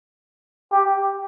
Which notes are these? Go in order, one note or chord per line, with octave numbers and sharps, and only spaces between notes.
G4